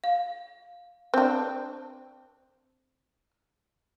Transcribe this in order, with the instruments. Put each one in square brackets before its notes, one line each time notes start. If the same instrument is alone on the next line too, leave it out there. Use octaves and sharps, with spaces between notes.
[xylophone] F5
[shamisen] C4 D4